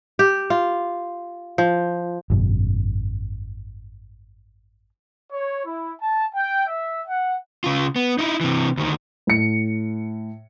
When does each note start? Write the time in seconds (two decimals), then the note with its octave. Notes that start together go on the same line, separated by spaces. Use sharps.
0.19 G4
0.50 F4
1.58 F3
2.30 G#1 F#2 B2
5.32 C#5
5.65 E4
6.00 A5
6.33 G5
6.67 E5
7.07 F#5
7.64 C#3 F4
7.96 B3
8.19 D#4 E4
8.41 C3 E3
8.77 D2 D#3
9.27 A2 C#7